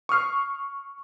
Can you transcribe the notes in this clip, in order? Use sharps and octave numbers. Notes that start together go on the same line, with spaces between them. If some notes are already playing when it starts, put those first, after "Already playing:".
C#6 D#6 F6 C7